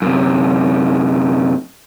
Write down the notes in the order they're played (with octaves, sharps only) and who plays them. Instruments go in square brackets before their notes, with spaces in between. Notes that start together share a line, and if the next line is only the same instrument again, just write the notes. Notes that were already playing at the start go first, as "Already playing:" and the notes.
[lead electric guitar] F#2 C3